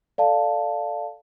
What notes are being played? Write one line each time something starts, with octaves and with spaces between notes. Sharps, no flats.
A4 D5 F5 A5